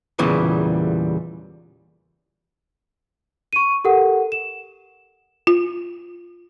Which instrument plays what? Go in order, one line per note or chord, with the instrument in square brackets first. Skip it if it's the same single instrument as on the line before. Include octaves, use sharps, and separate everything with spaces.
[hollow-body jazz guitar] E2 A#2 C#3 E3 G3
[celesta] C#6 D#7
G4 A4 A#4 F#5
E7
[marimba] F4